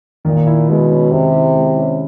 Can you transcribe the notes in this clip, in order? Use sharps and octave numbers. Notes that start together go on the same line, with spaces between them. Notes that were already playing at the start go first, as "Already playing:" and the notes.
A#2 D#3
E4
B2 G#3
C#4
C3 D#3
E4
G#3
C#4